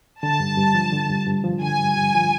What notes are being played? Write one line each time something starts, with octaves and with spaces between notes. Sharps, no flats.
D3 A5
G2
G2
F3
D3
G2
G2
F3
D3 G#5
G2
G2
F3